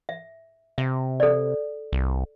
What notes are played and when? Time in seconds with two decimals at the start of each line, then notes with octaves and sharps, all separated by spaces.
0.09 E5
0.78 C3 E5
1.20 A4 D5
1.93 C2